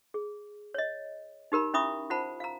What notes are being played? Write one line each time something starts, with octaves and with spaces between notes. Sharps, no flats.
G#4
C#5 D#5
D#4 G4 A#4 B5
C#4 E4 E5 B5 C#6 D#6
F4 C5 F#5 A5 B5
F5 A#5